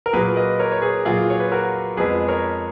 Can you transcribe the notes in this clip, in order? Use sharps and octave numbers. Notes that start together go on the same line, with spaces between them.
A#4
A#2 F#3 A#3 G#4 B4
B4 D#5
A#4 C#5
C#5
G#4 B4
A#2 F#3 A#3 F4 G#4
C#5
B4
F#4 A#4
F2 F3 G#3 B3 G#4 B4
A#4 C#5